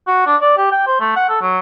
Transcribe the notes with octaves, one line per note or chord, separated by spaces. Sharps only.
F#4
D4
D5
G4
G5
C5
A3
F#5
A4
F#3